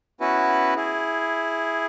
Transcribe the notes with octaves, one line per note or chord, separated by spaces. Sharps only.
B3 C#4 E4 F#4 B4
E4 G#4